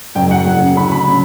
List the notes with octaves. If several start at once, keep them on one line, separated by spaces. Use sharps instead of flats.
F#1 F#2 C#3 F#3 G5
F#5
F#1 F#2 C#3 F#3
D2 C#3 F#3 B5
B5
C#3 F#3